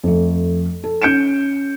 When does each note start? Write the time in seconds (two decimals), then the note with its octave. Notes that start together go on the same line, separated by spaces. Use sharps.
0.04 F2 A3
0.84 A4
1.02 C#4 G6 C#7 D7 E7